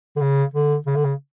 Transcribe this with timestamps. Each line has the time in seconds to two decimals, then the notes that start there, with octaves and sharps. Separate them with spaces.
0.16 D3
0.21 C#3
0.54 D3
0.86 C#3
0.96 D3
1.05 C#3